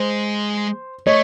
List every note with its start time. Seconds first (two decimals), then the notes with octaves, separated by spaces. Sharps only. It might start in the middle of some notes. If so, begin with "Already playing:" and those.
Already playing: G#3 C5
1.07 A3 C#5 D#5